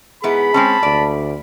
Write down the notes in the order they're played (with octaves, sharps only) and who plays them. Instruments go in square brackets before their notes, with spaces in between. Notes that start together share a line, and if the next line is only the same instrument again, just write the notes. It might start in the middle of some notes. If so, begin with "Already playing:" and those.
[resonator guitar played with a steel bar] G#2 B3 E4 [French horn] G#4 [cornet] B5
[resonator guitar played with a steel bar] G#3 C4 C#4 [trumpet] A5
[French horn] D2 [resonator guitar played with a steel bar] D5